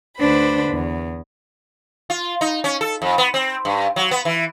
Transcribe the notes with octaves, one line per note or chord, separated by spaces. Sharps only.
D2 D3 D4 B4 C5 B5
E2
F4
D#4
C#4
A4
F2
B3
C4
G2
F#3
B3
E3